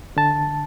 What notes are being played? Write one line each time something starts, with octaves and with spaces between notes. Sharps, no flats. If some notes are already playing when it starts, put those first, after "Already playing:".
D3 A5